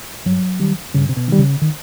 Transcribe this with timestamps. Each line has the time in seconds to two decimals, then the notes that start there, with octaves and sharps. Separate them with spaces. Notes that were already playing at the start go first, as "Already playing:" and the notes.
0.26 G2 F#3
0.60 D#3 G3
0.94 G2 C#3
1.09 C3
1.17 B2
1.28 D#3 G3
1.39 C#3
1.62 D#3